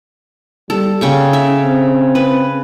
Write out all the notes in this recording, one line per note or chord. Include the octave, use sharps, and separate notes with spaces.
G3 A4
C#3 C#4 G5 C#6
E5
C4
B4